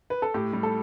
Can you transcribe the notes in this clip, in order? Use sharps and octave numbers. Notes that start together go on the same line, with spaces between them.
B4
A4
A2 G4
G3
A4